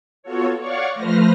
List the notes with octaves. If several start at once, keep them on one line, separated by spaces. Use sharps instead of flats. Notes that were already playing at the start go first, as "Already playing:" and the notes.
B3 F4 F#4 A4 C#5
C#5 D5 F5 F#5 C#6
F3 A3 B4 C5 F6 A#6